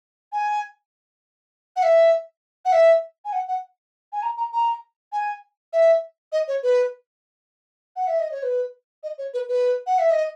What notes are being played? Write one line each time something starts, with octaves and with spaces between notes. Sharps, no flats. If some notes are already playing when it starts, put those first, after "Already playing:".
G#5
F#5
E5
F#5
E5
G#5
F#5
F#5
G#5
A#5
A#5
A#5
G#5
E5
D#5
C#5
B4
F#5
E5
D#5
C#5
B4
D#5
C#5
B4
B4
F#5
E5
D#5